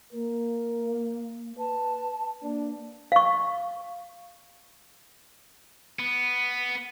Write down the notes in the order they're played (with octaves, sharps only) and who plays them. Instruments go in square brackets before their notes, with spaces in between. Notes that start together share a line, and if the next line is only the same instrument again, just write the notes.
[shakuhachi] A#3 [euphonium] A#4
[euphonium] B4 [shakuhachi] A5
[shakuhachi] A#3 [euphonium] D4
[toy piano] F5 C#6
[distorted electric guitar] B3